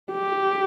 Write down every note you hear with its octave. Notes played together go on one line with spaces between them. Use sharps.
G4